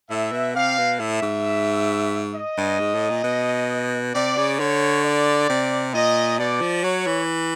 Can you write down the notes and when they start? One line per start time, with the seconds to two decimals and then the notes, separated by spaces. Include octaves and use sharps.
0.10 A2 E5
0.32 B2
0.55 C3 F5
0.78 B2
1.00 A2 E5
1.22 G#2
2.35 D#5
2.58 G2
2.80 G#2
2.94 A2
3.10 A#2
3.24 B2
4.15 C3 D5
4.37 C#3
4.59 D3 C#5
5.04 D5
5.50 C3
5.94 A#2 D#5
6.39 B2 D5
6.61 F3
6.83 F#3 C#5
7.07 E3